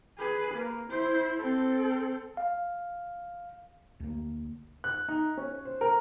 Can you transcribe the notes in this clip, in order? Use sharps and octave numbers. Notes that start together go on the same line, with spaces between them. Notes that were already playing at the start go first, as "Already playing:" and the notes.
G#4 B4
A#3
E4 C5
C4 A4
F5
D2 A#3
F#6
D#4
C#4
C5
A#4